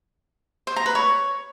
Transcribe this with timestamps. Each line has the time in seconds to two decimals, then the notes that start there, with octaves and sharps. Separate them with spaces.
0.67 C5
0.76 A#5
0.86 B4
0.95 C#5